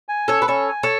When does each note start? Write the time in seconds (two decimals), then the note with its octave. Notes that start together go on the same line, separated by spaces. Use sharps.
0.09 G#5
0.28 C#4 A4 C#5
0.42 B4
0.48 C#4 A4 C#5
0.68 G#5
0.83 A4 C#5